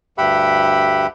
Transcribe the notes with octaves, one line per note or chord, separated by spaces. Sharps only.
D2 G2 G4 E5 F#5 B5